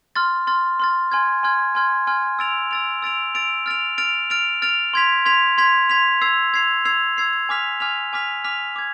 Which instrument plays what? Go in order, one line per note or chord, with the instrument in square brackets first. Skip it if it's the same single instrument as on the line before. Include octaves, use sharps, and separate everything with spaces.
[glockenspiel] C6 F6 A6
C6 F6 A6
C6 F6 A6
G#5 C6 F6 G#6
G#5 C6 F6 G#6
G#5 C6 F6 G#6
G#5 C6 F6 G#6
E6 A6 D7 F7
E6 A6 D7 F7
E6 A6 D7 F7
E6 A6 D7 F7
F6 A6 D7 F7
F6 A6 D7 F7
F6 A6 D7 F7
F6 A6 D7 F7
C6 G#6 B6 F7
C6 G#6 B6 F7
C6 G#6 B6 F7
C6 G#6 B6 F7
E6 G#6 C7 F7
E6 G#6 C7 F7
E6 G#6 C7 F7
E6 G#6 C7 F7
G#5 D6 F6 B6 F7
G#5 D6 F6 B6 F7
G#5 D6 F6 B6 F7
G#5 D6 F6 B6 F7
D6 G#6